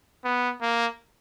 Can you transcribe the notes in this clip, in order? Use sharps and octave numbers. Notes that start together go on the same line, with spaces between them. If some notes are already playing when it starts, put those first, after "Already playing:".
B3
A#3